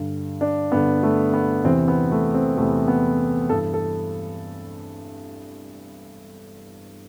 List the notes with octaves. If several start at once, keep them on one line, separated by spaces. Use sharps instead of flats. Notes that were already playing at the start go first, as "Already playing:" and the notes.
Already playing: G2 D3
D4
G2 D3 B3
A3
B3
E2 C3 E3 C4
B3
A3
C4
E2 C3 E3 A3
B3
G2 E3 A4
A4